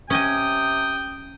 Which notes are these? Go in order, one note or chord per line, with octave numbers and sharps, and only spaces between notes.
C3 C#4 D#5 G5 G#5 D#6